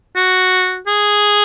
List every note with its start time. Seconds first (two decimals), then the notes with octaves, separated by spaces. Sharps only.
0.16 F#4
0.87 G#4